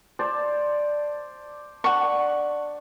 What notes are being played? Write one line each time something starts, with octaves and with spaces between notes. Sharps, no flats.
C5 D5 A5
D4 F#5 C#6